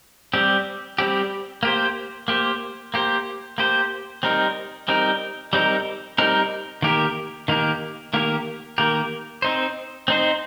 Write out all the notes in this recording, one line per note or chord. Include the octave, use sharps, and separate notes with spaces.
G3 C4 G4
G3 C4 G4
A#3 G4 C5
A#3 G4 C5
A#3 G4 C5
A#3 G4 C5
G3 C4 D#4 A#4
G3 C4 D#4 A#4
G3 C4 D#4 A#4
G3 C4 D#4 A#4
D#3 A#3 G4 A#4
D#3 A#3 G4 A#4
D#3 A#3 G4 A#4
D#3 A#3 G4 A#4
C4 D#4 C5
C4 D#4 C5